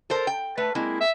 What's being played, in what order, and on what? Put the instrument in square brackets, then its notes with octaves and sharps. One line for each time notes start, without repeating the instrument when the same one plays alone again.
[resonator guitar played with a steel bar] A4 A#4 C5
G5
[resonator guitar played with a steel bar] A3 [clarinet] B4
[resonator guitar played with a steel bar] G#3 A#3 C4 [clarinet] E4
[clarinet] E5